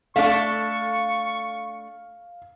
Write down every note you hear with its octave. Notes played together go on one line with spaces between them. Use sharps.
A3 D4 A4 F5 C#6